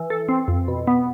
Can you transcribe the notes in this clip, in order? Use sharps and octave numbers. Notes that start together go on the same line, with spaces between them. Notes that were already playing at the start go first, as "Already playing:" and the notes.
Already playing: E3
A4
C4
F2
B2
B3